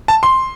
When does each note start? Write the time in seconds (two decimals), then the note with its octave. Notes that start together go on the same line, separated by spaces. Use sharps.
0.08 A5
0.23 C6